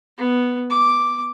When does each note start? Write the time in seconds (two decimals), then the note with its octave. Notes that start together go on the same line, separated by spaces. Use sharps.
0.18 B3
0.70 D6